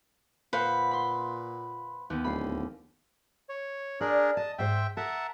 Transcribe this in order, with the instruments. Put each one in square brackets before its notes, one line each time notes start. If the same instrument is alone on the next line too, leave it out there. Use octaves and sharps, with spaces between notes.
[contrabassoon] A#2 [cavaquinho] B4 [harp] C5 F5 F#5
[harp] B5 C6
D#2 B3
[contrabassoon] D1 [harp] B5 C7
[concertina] C#5
[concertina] D4 G#4 A#4 [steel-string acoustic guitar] D5
[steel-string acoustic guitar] D#5 [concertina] A5
[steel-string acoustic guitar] G#2 C5 [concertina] E5 G5
[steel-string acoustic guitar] A#4 [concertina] E5 F#5 A5